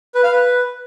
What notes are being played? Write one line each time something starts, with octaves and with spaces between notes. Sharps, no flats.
B4
F5
B4